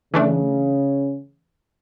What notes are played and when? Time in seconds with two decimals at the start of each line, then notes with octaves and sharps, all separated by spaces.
0.14 C#3 E3 A3 D4